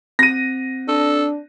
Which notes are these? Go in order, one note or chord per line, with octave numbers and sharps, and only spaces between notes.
C4 A#6 D#7
D4 A4